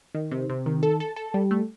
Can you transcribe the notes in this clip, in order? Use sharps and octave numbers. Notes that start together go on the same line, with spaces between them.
D#3
C3
C3
D#3
A4
A4
A4
G3
A3